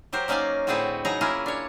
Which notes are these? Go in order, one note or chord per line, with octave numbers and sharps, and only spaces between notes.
F#3 G4 A#4 C5
F#3 A#3 C#4 D#4 D5 F5
A2 D3 C4 F#4 G#4 B4
C#3 F#3 D#4 G#4 A#5
A#3 C#4 E4 F4 G#4 A#4
D4 C#5